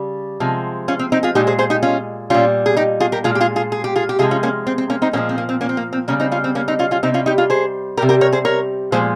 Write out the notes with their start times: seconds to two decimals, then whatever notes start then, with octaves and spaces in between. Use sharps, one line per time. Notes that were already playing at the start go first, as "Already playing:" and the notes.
Already playing: C#3 G3
0.40 C3 F3 G#3
0.88 C#4 F4
0.99 C4
1.12 C4 D#4
1.23 F4 G#4
1.35 A#2 G#3 D#4 G4
1.47 G#4 C5
1.59 G#4 C5
1.70 D#4 G4
1.83 C#4 F4
2.30 A#2 G3 C#4 F4
2.66 G#4
2.77 D#4 G4
3.00 F4 G#4
3.12 G4 A#4
3.24 A#2 G#3 F4 G#4
3.35 G4
3.41 F4 G#4
3.56 F4 G#4
3.72 G#4
3.84 G4
3.96 F4 G#4
4.09 G4
4.19 C3 F3 G#3 F4 G#4
4.31 C#4 F4
4.43 A#3 C#4
4.67 C4
4.78 C4
4.90 A#3 C#4
5.02 C4 D#4
5.13 A#2 F3 G#3 A#3 C#4
5.29 C4
5.38 A#3
5.49 C4
5.61 A#3 C#4
5.69 C4
5.77 A#3
5.93 C4
6.08 C#3 G3 A#3 C#4
6.20 C4 D#4
6.32 C#4 F4
6.44 C4
6.55 A#3 C#4
6.68 C4 D#4
6.79 C#4 F4
6.91 C#4 F4
7.03 C3 G3 C4 D#4
7.14 C#4 F4
7.26 D#4 G4
7.38 F4 G#4
7.50 G#4 C5
7.97 C3 G3 G4 A#4
8.09 G4 A#4
8.21 A#4 C#5
8.32 G#4 C5
8.45 A#4 C#5
8.92 A#2 F3 G#3 G#4 C5